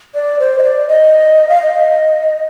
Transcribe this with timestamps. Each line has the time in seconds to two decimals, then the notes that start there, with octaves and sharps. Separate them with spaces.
0.15 D5
0.39 C5
0.59 D#5
0.63 D5
0.88 D#5
1.49 F5
1.62 D#5